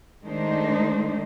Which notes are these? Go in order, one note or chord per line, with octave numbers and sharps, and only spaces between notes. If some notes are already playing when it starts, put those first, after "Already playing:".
D#3 G#3 A3 D4 D#4 C5